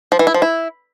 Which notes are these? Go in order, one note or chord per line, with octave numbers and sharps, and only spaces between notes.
F3
E3
E4
F3
E4